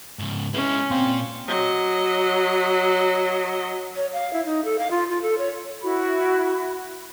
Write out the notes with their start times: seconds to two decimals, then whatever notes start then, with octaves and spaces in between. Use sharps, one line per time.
0.19 G#2 C#3
0.54 G#3 C#4 E4
0.91 A#2 C4 F5
1.47 F#3 D#5
3.95 C#5
4.13 F5
4.33 E4
4.46 D#4
4.65 A4
4.79 F5
4.91 F4
5.10 F4
5.22 A4
5.38 C#5
5.82 E4 F#4 B5